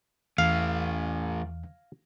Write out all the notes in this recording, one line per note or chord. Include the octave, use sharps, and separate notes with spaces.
E2 E3 A3 F5